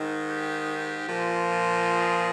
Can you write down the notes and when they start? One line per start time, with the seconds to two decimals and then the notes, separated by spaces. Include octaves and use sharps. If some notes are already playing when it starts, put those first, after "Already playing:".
Already playing: G#2 D#3
0.28 G4
1.08 A#2 F3
1.88 G#4